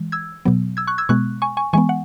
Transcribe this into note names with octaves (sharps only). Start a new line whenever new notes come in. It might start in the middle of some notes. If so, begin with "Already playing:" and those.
Already playing: E3 G#3
E6 G#6
B2 F#3 B3
E6 G#6
C#6 F#6
E6 G#6
B2 G#3 B3 C#6 F#6
G#5 C#6
G#5 C#6
E3 G#3 B3 G#5 C#6
F#5